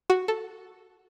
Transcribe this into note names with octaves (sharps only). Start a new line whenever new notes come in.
F#4
A4